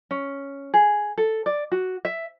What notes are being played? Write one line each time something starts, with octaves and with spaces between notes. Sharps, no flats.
C#4
G#4
A4
D5
F#4
E5